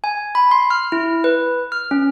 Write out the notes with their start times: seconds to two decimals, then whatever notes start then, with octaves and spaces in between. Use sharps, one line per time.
0.04 G#5
0.35 B5
0.51 C6
0.70 F6
0.92 E4
1.24 B4
1.72 F6
1.91 C#4